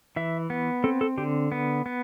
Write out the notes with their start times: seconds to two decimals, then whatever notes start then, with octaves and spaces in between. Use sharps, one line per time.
0.16 E3 E5
0.50 B3
0.84 C4 A4
1.01 A4
1.17 D3 G4
1.52 B3
1.86 B3